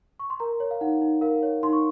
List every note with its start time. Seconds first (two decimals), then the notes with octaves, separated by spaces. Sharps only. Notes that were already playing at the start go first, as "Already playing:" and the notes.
0.20 C#6
0.30 C6
0.40 A#4 A#5
0.60 C#5
0.71 F5
0.81 D#4 F#5
1.01 D#4
1.21 A#4 F5
1.43 C#5
1.63 D#4 C6
1.73 C#6